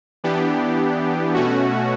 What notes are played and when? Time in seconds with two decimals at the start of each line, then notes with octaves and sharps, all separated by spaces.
0.24 E3 B3 D4 G4
1.34 B2 A3 C#4 F#4